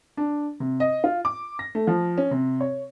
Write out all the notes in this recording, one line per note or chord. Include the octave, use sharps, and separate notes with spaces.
D4
C3
D#5
F4
D6
A#6
A3
F3
C#4
C3
C#5